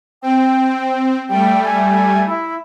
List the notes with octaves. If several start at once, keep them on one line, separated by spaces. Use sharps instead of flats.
C4 G5
G3 A3 G5
G#5
E4